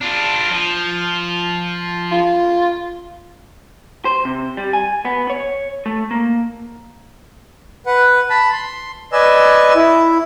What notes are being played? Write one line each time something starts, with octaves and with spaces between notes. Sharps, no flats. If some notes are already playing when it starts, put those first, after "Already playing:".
D4 F4
F3
F4
C5
C3
G3
G#5
B3
C#5
A3
A#3
B4 F#5
A5 B5
C6
B4 D5 D#5 G#5 E6
E4